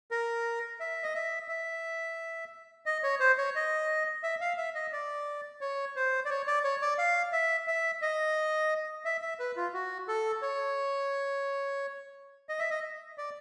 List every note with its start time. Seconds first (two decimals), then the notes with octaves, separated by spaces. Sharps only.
0.11 A#4
0.80 E5
1.03 D#5
1.15 E5
1.48 E5
2.86 D#5
3.03 C#5
3.20 C5
3.38 C#5
3.55 D#5
4.23 E5
4.41 F5
4.57 E5
4.75 D#5
4.93 D5
5.61 C#5
5.96 C5
6.25 D5
6.30 C#5
6.47 D5
6.64 C#5
6.82 D5
6.98 F5
7.33 E5
7.67 E5
8.02 D#5
9.05 E5
9.22 E5
9.40 B4
9.56 F4
9.74 F#4
10.08 A4
10.42 C#5
12.49 D#5
12.59 E5
12.71 D#5
13.18 D5